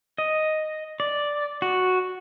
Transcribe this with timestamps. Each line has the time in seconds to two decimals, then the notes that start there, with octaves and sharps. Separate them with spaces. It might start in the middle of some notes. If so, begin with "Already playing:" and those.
0.18 D#5
1.00 D5
1.62 F#4